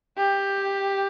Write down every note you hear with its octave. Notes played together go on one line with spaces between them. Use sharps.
G4